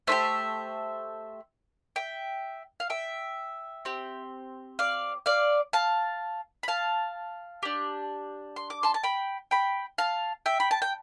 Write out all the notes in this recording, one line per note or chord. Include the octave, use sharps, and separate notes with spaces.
A3 D4 G4 C5 E5
E5 G5
F5
E5 G5
C4 G4
D5 F5
D5 F5
F5 A5
B5
F5 A5
D4 G4
C6
D6
A5 C6
A5
G5 B5
G5 B5
F5 A5
E5 G5
B5
A5
G5